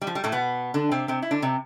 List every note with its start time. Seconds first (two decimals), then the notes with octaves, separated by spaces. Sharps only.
0.01 G3
0.07 F3
0.15 G3
0.24 A2 A3
0.32 B2 B3
0.74 D3 D4
0.91 C3 C4
1.08 C3 C4
1.22 E4
1.31 D3 D4
1.42 C3 C4